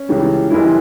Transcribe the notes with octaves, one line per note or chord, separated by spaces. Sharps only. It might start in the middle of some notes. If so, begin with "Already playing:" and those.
Already playing: C#4
C#2 C#3 E3 G3
F#1 F#2 E3 G3 E4